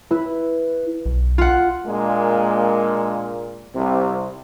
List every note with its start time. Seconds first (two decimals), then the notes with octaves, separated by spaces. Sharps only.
0.11 E4 B4
1.06 B1
1.38 F4 F#5
1.86 A#2 G#3 A#3 D4
3.75 C2 C3